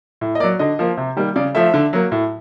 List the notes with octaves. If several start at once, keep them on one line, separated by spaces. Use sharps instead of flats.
A2
D#5
F#3 A#3 D5
D3 D#5
F3 A#3
C3
D#3 G3 A#3
C#3 D5
F3 A3 E5
D3
F#3 A#3
A2